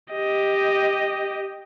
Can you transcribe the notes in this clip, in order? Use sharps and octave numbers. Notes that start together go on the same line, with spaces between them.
G4 D#5